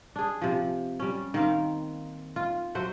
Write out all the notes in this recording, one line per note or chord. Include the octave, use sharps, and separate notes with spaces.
D4 G#4
C3 F3
G3 C#4
D#3 A#3 C4 F5
F4
F#3 C5 E5 F#5